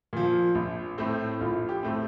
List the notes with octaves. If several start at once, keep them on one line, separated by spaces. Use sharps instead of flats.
A#2 F3
A#1
A2 A3 C4
A#1 F4
G4
A2 A3 C4